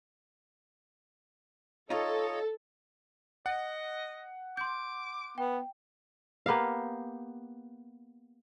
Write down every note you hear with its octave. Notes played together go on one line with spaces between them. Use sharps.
D#4 F4 A4 C#5 D#5
D#5 F#5
C6 D6 G6
B3 G5
A#3 B3 G4 F5